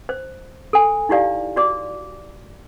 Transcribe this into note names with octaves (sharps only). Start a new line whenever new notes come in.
C5
A4 G#5
D#4 E4 G4 D5 F5
F#4 D5 D6